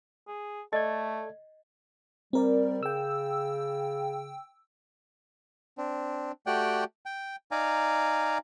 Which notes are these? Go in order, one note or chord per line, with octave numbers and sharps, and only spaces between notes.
G#4
A3 A4 D5 D#5 G#6
G3 C4 A#4 D5
C#3 G5 E6
C4 D4
A3 F#4 G4 D5 F#5 G5
G5
D#4 D5 F5 G#5 A#5